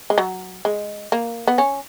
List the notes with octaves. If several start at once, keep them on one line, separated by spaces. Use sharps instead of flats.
G#3
F#3
G#3
A#3
B3
C#4